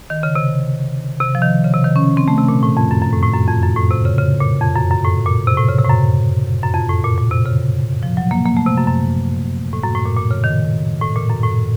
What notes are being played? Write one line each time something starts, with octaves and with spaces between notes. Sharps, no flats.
D#3
C#3
C3
C3
F3
D#3
C#3
C3
D#3
C#4
C4
A3
C3
A#2
A2
F2
F#2
F#2
A2
A2
F#2
F2
F#2
A2
C3
C#3
C#3
A#2
F2
F#2
F#2
A2
A#2
C3
A2
C#3
C3
A2
F#2
F#2
F2
A2
A#2
A#2
C3
C#3
F3
F#3
A#3
A#3
A3
C3
F#2
F#2
A2
F#2
A2
A#2
A#2
C#3
D#3
A2
A#2
F#2
A2